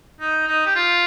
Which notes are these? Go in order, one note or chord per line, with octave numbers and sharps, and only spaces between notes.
D#4
D#4
G4
F4